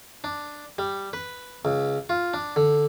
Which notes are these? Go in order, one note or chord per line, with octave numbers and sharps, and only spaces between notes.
D4
G3
B4
C#2
F4
D4
D3